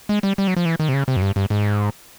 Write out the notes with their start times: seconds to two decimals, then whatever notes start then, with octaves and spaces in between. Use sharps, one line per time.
0.09 G#3
0.23 G3
0.38 G3
0.48 F#3
0.57 F3
0.66 E3
0.80 D#3
0.89 C3
0.94 C#3
1.08 C3
1.16 F#2
1.22 G2
1.36 G2
1.50 G#2